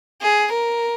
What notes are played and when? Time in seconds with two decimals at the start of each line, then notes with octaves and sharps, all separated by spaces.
0.22 G#4
0.52 A#4